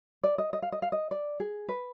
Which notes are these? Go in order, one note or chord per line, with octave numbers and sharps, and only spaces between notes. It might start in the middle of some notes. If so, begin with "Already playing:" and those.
D5
D#5
D#5
F5
D#5
F5
D#5
D5
G#4
B4